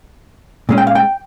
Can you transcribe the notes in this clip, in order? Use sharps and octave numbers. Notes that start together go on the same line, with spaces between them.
A#2 G#3 C#4
G5
F5
G5